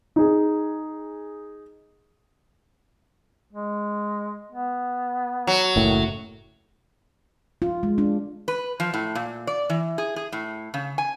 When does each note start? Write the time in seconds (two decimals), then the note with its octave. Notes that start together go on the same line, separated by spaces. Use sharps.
0.16 D#4 G#4
3.53 G#3
4.52 B3
5.47 F#3
5.76 F#1 A2 D#3
7.62 F4
7.83 G#3
7.98 D4
8.48 B4
8.80 F3
8.94 A2
9.15 A#2
9.47 D5
9.70 E3
9.98 G#4
10.16 G#4
10.32 A2
10.74 C#3
10.98 G#5